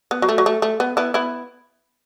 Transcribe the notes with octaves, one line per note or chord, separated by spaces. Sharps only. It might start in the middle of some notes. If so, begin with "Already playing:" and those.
B3
F#3
A3
F#3
A3
A3
B3
B3 E4
B3 E4